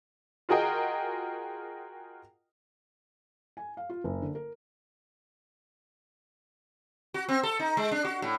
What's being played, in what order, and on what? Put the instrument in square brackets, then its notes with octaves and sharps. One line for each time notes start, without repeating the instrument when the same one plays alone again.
[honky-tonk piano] F4 F#4 G#4 A#4 D#5 G5
[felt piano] G#5
F5
F4
F#1
D3
A#4
[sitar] F#4
C4
A4
D#4
G#3
D4
F#4
A2